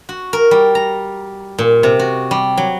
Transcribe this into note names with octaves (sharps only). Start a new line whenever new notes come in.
F#4
A#4
G3
A#5
A#2
C3
F#4
G3
F#3